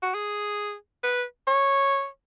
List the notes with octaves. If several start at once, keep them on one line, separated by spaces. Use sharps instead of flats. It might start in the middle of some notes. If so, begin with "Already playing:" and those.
F#4
G#4
B4
C#5